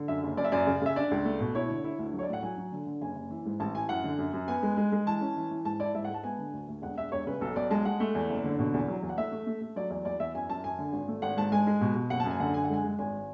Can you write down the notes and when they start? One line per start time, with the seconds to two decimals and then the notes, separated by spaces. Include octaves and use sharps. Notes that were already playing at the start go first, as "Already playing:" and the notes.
Already playing: D3
0.08 F#2 E5
0.23 F#1
0.37 F#2 D5
0.44 E5
0.52 F#2 D5
0.67 C#3
0.82 C#3 E5
0.96 D4 D5
1.11 C#2
1.25 A3
1.40 B2
1.55 E4 C#5
1.70 D3
1.84 E4
1.99 D2
2.13 F#3
2.19 C#5
2.23 D5
2.28 A2 F#5
2.42 F#3 G#5
2.58 F#3
2.72 D3
2.86 D3
3.01 F#1 G#5
3.16 F#1
3.30 E3
3.46 G#2
3.60 A1 A5
3.75 E3 G#5
3.89 F#2 F#5
4.04 D3
4.18 F#2
4.33 F#2
4.48 B3 G#5
4.63 G#3
4.77 G#3
4.92 G#3
5.06 E3 A5
5.21 C#4
5.37 E3
5.51 E3
5.65 G#2 A5
5.80 E4 D5
5.94 G#2 E5
6.04 F#5
6.09 G#3
6.14 A5
6.24 B3 G#5
6.38 D3
6.53 D2
6.68 D2
6.82 E1 F#5
6.97 E1 E5
7.12 E1 C#5
7.27 C#3 B4
7.41 B1 A4
7.56 B1 D5
7.70 G#3 A5
7.85 G#3 F#5
8.00 A3
8.15 E2
8.29 F#1
8.44 D3
8.59 B2
8.74 E2
8.88 F#3
9.02 E2
9.09 F#5
9.17 A3 E5
9.32 A3
9.47 A3
9.61 A3
9.76 F#3 D5
9.90 E2 D5
10.05 E2 D5
10.20 E2 E5
10.35 F#2 G#5
10.49 F#2 A5
10.64 F#2 G#5
10.79 D3
10.93 G#1
11.08 A3
11.22 G#1 F#5
11.37 G#2 A5
11.52 G#3 G#5
11.67 G#3
11.81 B2
11.96 B2
12.10 F#1 F#5
12.20 A5
12.25 F#2
12.30 G#5
12.40 D3 F#5
12.54 F#2 G#5
12.64 F#5
12.69 G#3 G#5
12.84 G#3
12.98 G#1 G#5